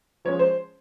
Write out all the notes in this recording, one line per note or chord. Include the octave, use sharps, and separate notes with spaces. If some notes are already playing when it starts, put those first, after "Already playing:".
F3 G#3 C#4 C#5
C5